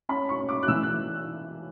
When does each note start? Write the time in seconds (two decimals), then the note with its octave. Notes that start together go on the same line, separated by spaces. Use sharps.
0.09 C#4 B5
0.29 C#6
0.39 C#4
0.49 D6
0.63 F#6
0.68 E3 E6
0.83 F#6